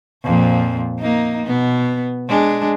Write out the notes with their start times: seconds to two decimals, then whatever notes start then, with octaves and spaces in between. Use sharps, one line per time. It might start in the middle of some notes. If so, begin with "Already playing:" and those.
0.24 F2 A#2 F3
0.99 A#3 D#4
1.47 B2 B3
2.29 G#3 D4